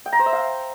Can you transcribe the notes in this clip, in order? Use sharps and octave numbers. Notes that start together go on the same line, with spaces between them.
G5
A#5
C5
E5
F5